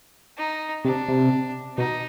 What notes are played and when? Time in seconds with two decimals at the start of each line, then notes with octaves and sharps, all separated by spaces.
0.38 D#4
0.85 C3 D4
1.08 C3
1.78 B2 D#4